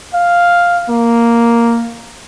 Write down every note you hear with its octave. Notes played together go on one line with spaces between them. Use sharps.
F5
A#3